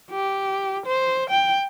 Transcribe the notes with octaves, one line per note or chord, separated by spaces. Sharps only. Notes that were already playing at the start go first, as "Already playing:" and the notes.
G4
C5
G5